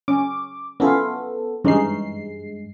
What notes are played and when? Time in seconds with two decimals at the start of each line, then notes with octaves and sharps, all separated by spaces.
0.08 C#4 D6
0.80 B3 C#4 E4 F4 A4
1.65 G2 E3 G#3 C#4 D#4 C7